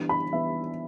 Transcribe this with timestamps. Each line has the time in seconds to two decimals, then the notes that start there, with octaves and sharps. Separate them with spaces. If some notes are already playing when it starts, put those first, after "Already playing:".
Already playing: E3 G3 B3 D4
0.09 B5
0.32 E3 G3 B3 D4 E5